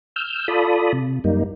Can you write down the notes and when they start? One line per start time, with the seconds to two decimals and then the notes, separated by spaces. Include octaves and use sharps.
0.16 E6 F6 G6
0.48 F4 A4 D5 B5 D#6
0.93 C3
1.24 F#2 G3 A#3 D#4